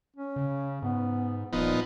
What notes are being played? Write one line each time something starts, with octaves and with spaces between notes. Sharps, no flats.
C#4
C#3
G#2 B3
D#1 A#2 F3 B3 D#4